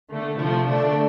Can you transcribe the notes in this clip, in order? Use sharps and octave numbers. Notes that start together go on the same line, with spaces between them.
D3 A3
C3 F3 A3 E4
D3 A3 D4